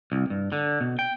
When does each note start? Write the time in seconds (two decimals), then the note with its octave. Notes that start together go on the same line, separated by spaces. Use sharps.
0.12 C2
0.30 G2
0.52 D3
0.81 B2
0.99 G5